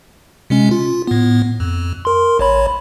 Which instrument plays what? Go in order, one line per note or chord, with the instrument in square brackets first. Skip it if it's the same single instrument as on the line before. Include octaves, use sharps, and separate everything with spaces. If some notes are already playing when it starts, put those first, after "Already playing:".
[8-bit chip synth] C3 G#3 C#4
F4
A2 B3
F2
A#4 C6
A1 C#5 B5